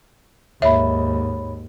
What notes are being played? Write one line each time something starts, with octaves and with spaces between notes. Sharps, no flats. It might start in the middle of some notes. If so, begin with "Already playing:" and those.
D#2 G#2 C#5 E5 B5